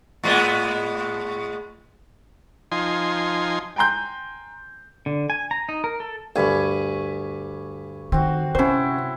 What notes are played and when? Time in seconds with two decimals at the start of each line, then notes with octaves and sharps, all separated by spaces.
0.23 A2 G#3 B3
2.72 F3 D#4 G#5 C6
3.76 G5 G#5 A#5 C6 G6
5.06 D3
5.30 G#5
5.51 A#5
5.69 D#4
5.84 A#4
6.00 A4
6.36 D2 G2 G#5 B5 C#6
8.12 D#3 C4 F#4
8.55 C3 F#3 C#4 E4 C5